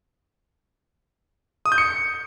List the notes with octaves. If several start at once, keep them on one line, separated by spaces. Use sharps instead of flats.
D#6
G6
C#7